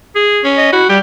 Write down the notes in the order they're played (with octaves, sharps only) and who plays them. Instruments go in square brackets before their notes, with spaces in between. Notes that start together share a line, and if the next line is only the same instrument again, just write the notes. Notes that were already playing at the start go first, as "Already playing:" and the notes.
[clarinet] G#4
[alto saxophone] C#4
[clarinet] D#5
[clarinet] E4 [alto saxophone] F#4
[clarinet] G3 [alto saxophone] G4